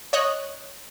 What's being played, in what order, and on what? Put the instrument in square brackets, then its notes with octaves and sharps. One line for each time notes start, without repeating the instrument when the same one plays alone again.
[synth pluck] C#5 D#5 F#6